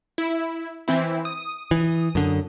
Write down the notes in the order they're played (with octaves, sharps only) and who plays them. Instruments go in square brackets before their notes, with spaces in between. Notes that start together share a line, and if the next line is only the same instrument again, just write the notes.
[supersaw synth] E4
E3 C4 E4
D#6
[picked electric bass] E3
F#2 D3